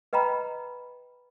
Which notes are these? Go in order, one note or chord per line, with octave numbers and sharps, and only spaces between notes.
B4 D#5 G5 A#5 B5